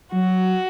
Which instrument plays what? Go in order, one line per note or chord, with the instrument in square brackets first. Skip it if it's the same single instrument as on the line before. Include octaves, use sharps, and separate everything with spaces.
[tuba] F#3 [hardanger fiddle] F#4